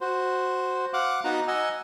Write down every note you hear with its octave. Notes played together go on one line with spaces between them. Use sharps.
F#4 C5
F5 F#5 D6 F#6
B3 D#4 F#4 A#5
D#5 F#5 G#5 E6